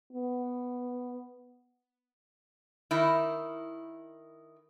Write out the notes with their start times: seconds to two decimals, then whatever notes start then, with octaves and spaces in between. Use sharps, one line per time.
0.13 B3
2.91 D#3 E4